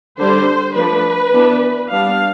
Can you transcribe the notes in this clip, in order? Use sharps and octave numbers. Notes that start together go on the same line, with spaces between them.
D3 G3 D4 C5
F3 A3 D4 B4
E3 B3 D4
G3 B3 D4 F5